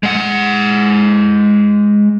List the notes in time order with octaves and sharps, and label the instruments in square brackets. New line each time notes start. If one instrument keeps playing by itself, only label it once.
[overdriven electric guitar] G#3 F#5